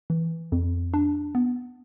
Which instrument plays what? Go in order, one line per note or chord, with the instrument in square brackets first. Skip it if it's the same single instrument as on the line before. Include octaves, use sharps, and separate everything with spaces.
[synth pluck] E3
F2
D4
B3